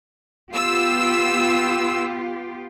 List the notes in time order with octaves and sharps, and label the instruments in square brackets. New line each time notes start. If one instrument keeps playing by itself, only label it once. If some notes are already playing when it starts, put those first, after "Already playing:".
[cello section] B3 F4 G4 [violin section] E6